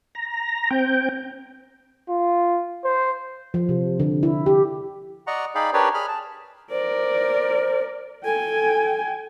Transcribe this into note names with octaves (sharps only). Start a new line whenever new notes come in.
A#5
C4 G5
F4
C5
F3
C3
D3
E4
G4
D5 D#5 F#5 A#5 C#6
D#4 G#4 D5 F5 G5 B5
D4 G4 A#4 B4 C#5 D5
G#4 B5 F6
A5
A#4 C5 D5
A4 G5 G#5